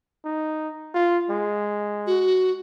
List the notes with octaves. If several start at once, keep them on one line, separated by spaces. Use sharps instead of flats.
D#4
F4
G#3
F#4